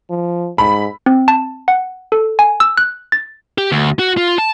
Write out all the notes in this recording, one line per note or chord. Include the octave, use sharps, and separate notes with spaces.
F3
G#2 B5
C4
A5
F#5
A4
G#5
E6
F#6
A6
G4
D2
F#4
F4
A5